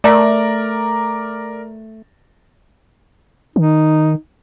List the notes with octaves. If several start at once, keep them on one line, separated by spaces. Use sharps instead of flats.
A3 A#4 D5
D#3 D#4